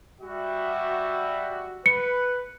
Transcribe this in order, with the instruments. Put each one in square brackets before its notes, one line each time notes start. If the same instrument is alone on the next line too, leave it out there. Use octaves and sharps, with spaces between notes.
[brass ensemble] G3 F#4 E5
[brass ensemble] B4 [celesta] C#7